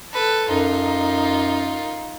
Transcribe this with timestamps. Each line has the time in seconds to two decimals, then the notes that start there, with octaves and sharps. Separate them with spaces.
0.13 A4 B4
0.49 F#2 D#4 F4